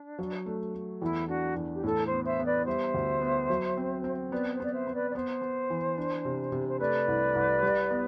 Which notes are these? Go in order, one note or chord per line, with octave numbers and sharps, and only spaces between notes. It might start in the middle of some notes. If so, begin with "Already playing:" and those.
Already playing: D4
F#3
A3
A3
E2 E4
D4 F#4
E2
G4
A2 A4
C5
B3
C5 E5
B3
B4 D5
G3 C5 E5
D2
B3
F#3
C4
C4
B3 B4 D5
C5
B3 D5
C5 E5
B3
B4 D5
D5
B3 C5
B3
E3
D4
C3
C3
C5
A3 B4 D5
C2
C2
G3
B3